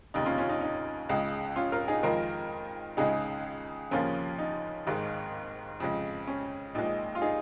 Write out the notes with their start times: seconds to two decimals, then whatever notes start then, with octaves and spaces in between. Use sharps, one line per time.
0.14 F1 D#2 C#3 D#4
0.26 C#4 F4
0.38 C#4 F4
0.49 D#4
0.61 D#4
1.09 C#2 C#3 G#3
1.56 C#4 F4
1.72 F4 A#4
1.88 D#4 G#4
2.03 F2 D#3 G#3 F4 A#4
2.97 C#2 C#3 G#3 D#4 G#4
3.91 D#2 C#3 F3 A#3 C#4 F4
4.39 D#4
4.87 G#1 G#2 D#3 G#3
5.80 F2 C#3 G#3
6.27 C#4
6.75 A#1 A#2 G#3 D#4
7.15 F4
7.22 D#4 G#4